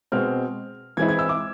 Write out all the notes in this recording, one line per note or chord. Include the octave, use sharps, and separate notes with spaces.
B2 G#3 C4 F6
E3 G#3 C4 E4 G#6
G#6
E6
D6